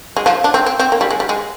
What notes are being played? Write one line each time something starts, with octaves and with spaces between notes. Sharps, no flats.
G#3
F3
D4
C4
C4
C4
A#3
G3
G#3
G3
G#3